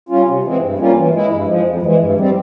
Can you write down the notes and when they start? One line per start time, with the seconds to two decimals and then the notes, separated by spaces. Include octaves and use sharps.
0.09 G3 C#4 F4
0.26 C3
0.43 E3 G#3 C4
0.60 G2
0.78 G3 A#3 C#4 F4
0.95 E3
1.13 G#3 E4
1.30 G2
1.47 F3 G#3
1.65 F2
1.82 E3 G#3
1.99 G2
2.16 G3 C4